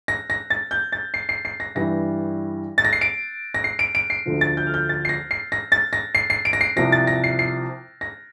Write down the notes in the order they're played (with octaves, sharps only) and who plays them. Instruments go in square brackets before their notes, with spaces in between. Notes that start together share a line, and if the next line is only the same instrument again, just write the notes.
[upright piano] A#6
A#6
A6
G6
A6
C7
C7
C7
A#6
G2 E3 G3 A#6
A6
A#6
C7
D7
A#6
C7
D7
D7
C7
D2 D3 F3
A6
G6
F6
G6
A6
C7
A#6
C7
A#6
A6
A#6
C7
C7
D7
A#6
C7
C2 C3 F3 A#6
A6
A#6
C7
C7
A#6